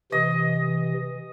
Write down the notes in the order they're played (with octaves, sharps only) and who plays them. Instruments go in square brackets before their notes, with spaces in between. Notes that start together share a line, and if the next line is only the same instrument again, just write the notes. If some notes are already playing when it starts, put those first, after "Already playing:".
[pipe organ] C3 E3 [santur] D#5